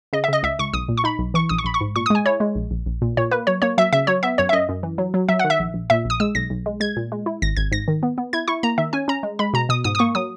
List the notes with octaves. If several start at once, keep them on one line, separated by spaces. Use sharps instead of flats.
C#3 D#5
E5
C#3 D#5
C#2 E5
C#2 C#6
B1 D#6
A#2
C#6
D#4 B5
B1
E3 C#6
A#1 D#6
C#6
A#1 B5
C#6
G#2
A#2 C#6
D#6
G#3 G#5
E4 C#5
G#3
A#1
A#1
A#1
A#2
A#2 C#5
A#3 B4
F#3 C#5
A#3 C#5
F#3 E5
C#3 E5
F#3 C#5
B3 E5
F#2 C#5
E5
F#2 D#5
F#2
E3
F#3
F#3
F#3 E5
D#3 F#5
E5
A#1
A#1
A#2 E5
A#1 D#6
G#3 E6
B1 A#6
B1
G#3
G#3 G#6
A#2
G#3
E4
G#1 A#6
G#1 G#6
G#2 A#6
D#3
B3
B3
E4 G#6
E4 C#6
A#3 A#5
D#3 E5
C#4 G#5
C#4 A#5
G#3
G#3 B5
B2 A#5
B2 D#6
G#2 D#6
D#6
A#3 C#6
F#3 D#6